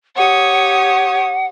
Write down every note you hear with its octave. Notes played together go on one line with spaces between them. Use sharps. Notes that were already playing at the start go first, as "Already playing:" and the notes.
G4 C#5 F#5 D#6